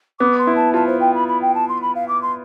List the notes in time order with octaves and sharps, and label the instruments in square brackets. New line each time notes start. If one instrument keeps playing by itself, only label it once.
[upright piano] B3 [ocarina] D6
[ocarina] C6
[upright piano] E4
[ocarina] A5
[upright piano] F4 [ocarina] A5
[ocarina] C5
G5
B5
B5
G5
A5
C6
B5
F5
D6
C6